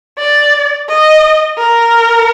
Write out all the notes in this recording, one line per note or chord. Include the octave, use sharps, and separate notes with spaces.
D5
D#5
A#4